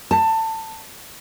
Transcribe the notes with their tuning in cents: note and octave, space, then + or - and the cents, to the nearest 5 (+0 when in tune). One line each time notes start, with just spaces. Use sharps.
A5 +20